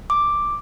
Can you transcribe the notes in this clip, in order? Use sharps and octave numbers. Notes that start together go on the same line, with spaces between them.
D6